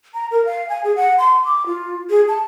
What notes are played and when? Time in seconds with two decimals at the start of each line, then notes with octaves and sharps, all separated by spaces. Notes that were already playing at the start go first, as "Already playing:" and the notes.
0.14 A#5
0.31 A#4
0.45 F5
0.69 G#5
0.84 G#4
0.96 F#5
1.18 C6
1.45 D6
1.66 F4
2.10 G#4
2.28 A5